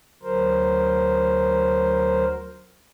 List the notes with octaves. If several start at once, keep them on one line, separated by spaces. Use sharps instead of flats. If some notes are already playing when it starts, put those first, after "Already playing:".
D2 F#3 A#4 C5